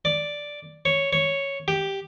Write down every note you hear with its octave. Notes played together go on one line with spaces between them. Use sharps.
D5
C#5
C#5
G4